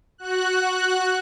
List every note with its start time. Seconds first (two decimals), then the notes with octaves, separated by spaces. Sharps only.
0.18 F#4 F#6